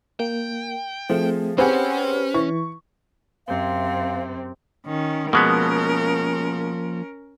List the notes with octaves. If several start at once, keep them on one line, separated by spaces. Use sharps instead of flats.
A#3 G5
F3 A3 C4 G#4
C4 C#4 G4 G#4 B4 C5 F#5
E3 C#6
F#2 C3 C4 F5
D#3 C#4
B2 F3 G#3 A#3 B3 C#4 A#4